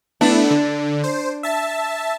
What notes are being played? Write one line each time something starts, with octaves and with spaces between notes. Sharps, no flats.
A3 B3 D4 E4
D3
C5
E5 A5